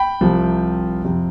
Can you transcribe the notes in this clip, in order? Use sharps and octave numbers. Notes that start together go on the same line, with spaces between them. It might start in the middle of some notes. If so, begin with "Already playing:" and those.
Already playing: G5 B5
C2 C3 F3
F2 C3 F3